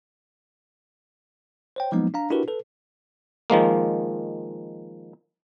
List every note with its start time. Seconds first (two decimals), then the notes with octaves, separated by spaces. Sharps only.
1.76 C5 C#5 G5
1.92 F3 F#3 G#3 A#3 B3 D#4
2.14 D4 F5 A#5
2.30 D4 E4 F#4 G4 A#4 B4
2.48 A4 B4
3.50 D#3 F3 G#3 A#3